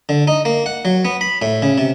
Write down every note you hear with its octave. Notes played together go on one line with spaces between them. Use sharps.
D3
D#4
A#3
F#5
F#3
B3
B5
A2
C#3
C3